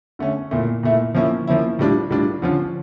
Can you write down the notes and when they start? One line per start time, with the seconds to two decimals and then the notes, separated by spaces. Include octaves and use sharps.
0.19 D3 A3 C#4
0.51 A#2 A3 E4
0.83 A#2 A3 E4
1.15 F3 A#3 C#4 E4
1.47 F3 A#3 C#4 E4
1.79 A2 G3 D4 F4
2.10 A2 G3 D4 F4
2.42 D3 F3 C#4 F4